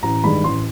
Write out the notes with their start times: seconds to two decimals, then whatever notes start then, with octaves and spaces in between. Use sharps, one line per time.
0.03 A1 A#5
0.23 G2 D#3 G#3 B5
0.44 A1 C6